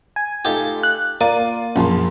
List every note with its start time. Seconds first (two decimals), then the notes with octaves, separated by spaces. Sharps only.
0.16 G#5
0.45 A3 D#4 F4 G4 A4
0.83 F#6
1.21 A#3 F4 D5 D#7
1.76 A#1 F#2 A5 C6